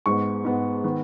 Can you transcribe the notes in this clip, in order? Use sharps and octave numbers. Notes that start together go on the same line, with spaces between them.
G#2 G#3 B3 C#6
G#2 G#3 B3
D#3 B3